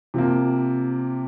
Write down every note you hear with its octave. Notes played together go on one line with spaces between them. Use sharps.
C3 F3 A#3